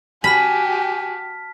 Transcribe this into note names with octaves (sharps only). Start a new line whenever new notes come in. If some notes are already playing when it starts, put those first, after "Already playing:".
F#4 G4 G#5 A5 B5 F6 B6